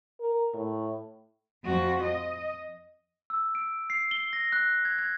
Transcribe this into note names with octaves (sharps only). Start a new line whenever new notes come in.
A#4
A2
F2 F#4
D#5
E6
D7
C7
G7
A#6
F#6
G#6
G#6